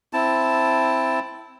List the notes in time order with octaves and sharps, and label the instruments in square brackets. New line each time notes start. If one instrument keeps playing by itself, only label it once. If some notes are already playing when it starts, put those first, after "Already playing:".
[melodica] C4 E4 A5